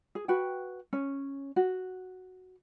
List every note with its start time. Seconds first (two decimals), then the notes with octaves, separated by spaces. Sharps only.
0.15 G#4
0.28 F#4 B4 G5
0.93 C#4
1.56 F#4